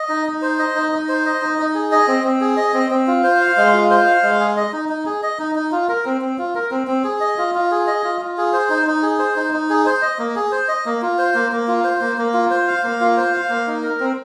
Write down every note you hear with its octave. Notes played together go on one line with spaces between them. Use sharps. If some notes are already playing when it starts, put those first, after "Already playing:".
Already playing: D#5
D#4
D#4
C5
D#5
D#4
D#4
C5
D#5
D#4
D#4
G#4
D#5
C4
C4
G#4
D#5
C4
C4
F4
C5
F5
G#3
F4
C5
F5
G#3
G#4
D#5
D#4
D#4
G#4
D#5
D#4
D#4
F4
A#4
C4
C4
F4
A#4
C4
C4
G#4
D#5
F4
F4
G#4
D#5
F4
F4
G#4
C5
D#4
D#4
G#4
C5
D#4
D#4
G#4
C5
D#5
A#3
G#4
C5
D#5
A#3
F4
C5
A#3
A#3
F4
C5
A#3
A#3
F4
C5
F5
A#3
F4
C5
F5
A#3
D#4
A#4
C4